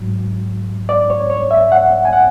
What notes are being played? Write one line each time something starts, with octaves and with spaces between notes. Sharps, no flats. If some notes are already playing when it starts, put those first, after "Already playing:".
Already playing: G#2 F#3
D5
C#5
C#5
E5
F#5
G#5
F#5